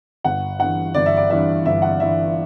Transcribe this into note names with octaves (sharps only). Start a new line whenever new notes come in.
G1 F#5
G2 E3 F#5
G1 D5
E5
D5
G2 E3 E5
G1 E5
F#5
G2 E3 E5